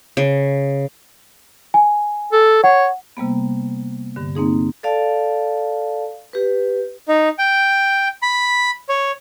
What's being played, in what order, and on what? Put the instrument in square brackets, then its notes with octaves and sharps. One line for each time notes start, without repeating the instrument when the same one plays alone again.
[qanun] C#3
[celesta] G#5
[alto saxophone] A4
[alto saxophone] C#5 [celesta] F#5
[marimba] C3 G3 A#3 B3
G2 D3
A#3 C4 D#4 G#4
[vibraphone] A4 D5 F5 A5
G4 B4
[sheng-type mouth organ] D#4
G5
B5
C#5